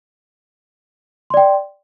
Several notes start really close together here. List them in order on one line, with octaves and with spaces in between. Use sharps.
C6 D5 G5